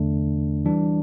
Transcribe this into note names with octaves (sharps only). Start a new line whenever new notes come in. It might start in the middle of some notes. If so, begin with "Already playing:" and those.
Already playing: E2 D3 A3 D4
E3 G3 D4